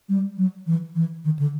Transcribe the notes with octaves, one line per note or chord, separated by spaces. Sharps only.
G3
F#3
E3
E3
D#3
D3